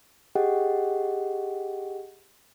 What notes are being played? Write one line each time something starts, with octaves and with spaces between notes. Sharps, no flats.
G4 G#4 D#5 F#5 G5